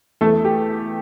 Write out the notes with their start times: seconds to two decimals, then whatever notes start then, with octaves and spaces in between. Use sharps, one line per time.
0.21 E2 A3 A4
0.45 G4